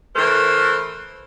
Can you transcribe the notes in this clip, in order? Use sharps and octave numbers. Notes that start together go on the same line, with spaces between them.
E3 A3 A#4 C5